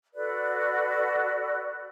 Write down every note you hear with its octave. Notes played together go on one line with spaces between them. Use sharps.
F#4 A4 B4 D5